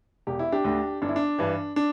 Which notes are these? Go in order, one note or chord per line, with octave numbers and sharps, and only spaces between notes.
E1 G4
E4
D4 G4
D2 D3
G1 D4
E4
D4
G2 E3
D4